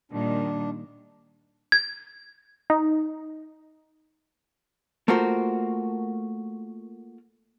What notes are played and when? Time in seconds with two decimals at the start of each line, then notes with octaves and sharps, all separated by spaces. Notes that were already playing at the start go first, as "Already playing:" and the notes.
0.12 A#2 D#3 G3 D4
1.72 G#6
2.70 D#4
5.08 A3 A#3 F4 F#4 A#4 C5